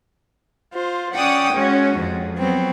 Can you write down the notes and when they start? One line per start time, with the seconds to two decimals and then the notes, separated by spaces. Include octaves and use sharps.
0.73 F4 C5
1.14 C#4 D5 F#5 G5 D#6
1.54 G#3 C#4 F#4
1.96 F2
2.37 F#3 B3 C4